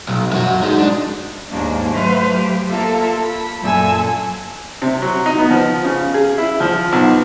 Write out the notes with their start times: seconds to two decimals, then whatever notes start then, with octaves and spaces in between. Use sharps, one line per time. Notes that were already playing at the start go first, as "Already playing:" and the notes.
0.08 B1
0.33 F#2 F#4
0.63 G#3 D#4
0.79 D4
1.51 D#2 G#2 A#3 D4
1.94 F#3 A3 B4 C5 F5
2.38 G4
2.70 A#3 F4 A4 E5 F5
3.22 B5
3.61 F#2 A#2 A4 G#5 A5 E6
4.82 C3
5.02 F#3
5.26 D#4
5.38 B3
5.50 F3
5.85 C#3
6.14 G#4
6.38 E4
6.60 F3
6.92 B1